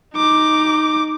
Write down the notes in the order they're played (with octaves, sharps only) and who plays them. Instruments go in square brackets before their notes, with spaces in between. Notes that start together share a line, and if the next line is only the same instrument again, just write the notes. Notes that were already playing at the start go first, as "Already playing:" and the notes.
[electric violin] D#4 D6